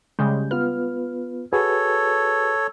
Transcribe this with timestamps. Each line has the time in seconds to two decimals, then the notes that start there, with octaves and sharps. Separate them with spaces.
0.19 C#3 G3 G#3 G6
0.51 B3 F4 B4 F6
1.53 F#4 G#4 A4 B4 C#5